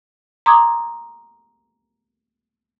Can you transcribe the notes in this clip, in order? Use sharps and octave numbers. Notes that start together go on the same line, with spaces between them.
A#5 C6 D6 D#6 G#6